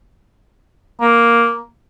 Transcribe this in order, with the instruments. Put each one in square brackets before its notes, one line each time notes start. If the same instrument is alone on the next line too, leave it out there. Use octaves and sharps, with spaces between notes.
[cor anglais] A#3